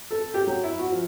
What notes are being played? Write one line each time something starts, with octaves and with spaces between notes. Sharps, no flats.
A4
G4
F#3
E4
F#4
F3